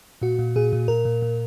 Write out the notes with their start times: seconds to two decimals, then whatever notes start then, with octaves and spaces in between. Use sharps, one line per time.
0.21 A#2 F#4
0.39 A#2
0.56 A#2 G#4
0.73 A#2
0.88 A#2 A#4
1.05 A#2
1.22 A#2